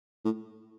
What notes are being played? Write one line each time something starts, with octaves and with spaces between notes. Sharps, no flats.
A2